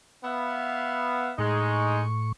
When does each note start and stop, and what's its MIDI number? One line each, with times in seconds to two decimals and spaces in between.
0.24 1.32 59
0.24 1.32 76
0.24 1.32 77
1.38 2.32 45
1.38 2.01 56
1.38 2.01 63
1.38 2.32 85